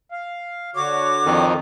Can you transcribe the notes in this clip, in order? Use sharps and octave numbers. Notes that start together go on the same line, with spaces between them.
F5
D3 F#4 C#5 D6
F2 D#3